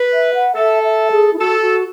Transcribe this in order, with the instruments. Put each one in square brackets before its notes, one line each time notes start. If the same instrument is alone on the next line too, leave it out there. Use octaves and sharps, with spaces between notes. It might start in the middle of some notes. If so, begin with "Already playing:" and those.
Already playing: [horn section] B4
[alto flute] E5
F#5
[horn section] A4 [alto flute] E5
[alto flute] E5
G#4
E4
[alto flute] F#4 [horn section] A4
[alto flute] F#4